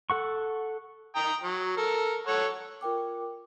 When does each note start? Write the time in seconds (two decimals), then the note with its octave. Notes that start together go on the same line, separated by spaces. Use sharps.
0.10 A4 F#5 C#6
1.15 G5 A#5 D#6
1.43 F#3
1.77 A4 A#4
2.27 A4 C#5 F#5
2.81 F4 A#4 G5 D6